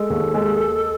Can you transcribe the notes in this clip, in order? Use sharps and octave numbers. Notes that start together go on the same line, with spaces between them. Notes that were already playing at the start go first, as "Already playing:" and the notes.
Already playing: G#3 A4
D#2
G#3